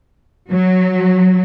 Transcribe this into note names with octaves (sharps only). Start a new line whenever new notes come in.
F#3